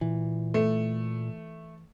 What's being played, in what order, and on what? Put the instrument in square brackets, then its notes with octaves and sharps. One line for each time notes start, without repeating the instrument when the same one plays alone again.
[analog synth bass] A#2 [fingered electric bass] E3
[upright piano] A3